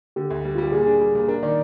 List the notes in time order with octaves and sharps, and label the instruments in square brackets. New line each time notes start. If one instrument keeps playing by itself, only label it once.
[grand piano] D3 [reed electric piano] G4
[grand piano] D2
G3
[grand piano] G3 [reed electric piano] F4
[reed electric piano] G4
[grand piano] A#2 [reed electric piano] G#4
[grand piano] D4 [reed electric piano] G#4
[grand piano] G3
A#2
[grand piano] D4 [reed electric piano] A#4
[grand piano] D#3 [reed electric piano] D5